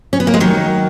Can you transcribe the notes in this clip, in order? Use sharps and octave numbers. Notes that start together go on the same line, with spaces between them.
C#4
B3
A#3
G#3
D#3 F#3